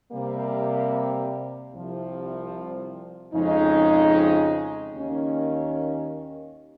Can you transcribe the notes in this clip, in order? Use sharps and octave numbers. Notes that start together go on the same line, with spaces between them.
C3 G3 A#3
C2 C3 F3
F2 C#3 G#3 D#4
D#2 D#3 A#3 C#4